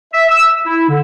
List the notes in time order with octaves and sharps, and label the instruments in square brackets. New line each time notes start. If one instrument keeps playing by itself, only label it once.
[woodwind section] E5
E6
E4
D3